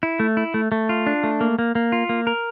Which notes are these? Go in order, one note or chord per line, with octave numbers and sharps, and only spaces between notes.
E4
A3
E4
A3
A3
F4
D4
A3
A#3
A#3
A#3
F4
A#3
A#4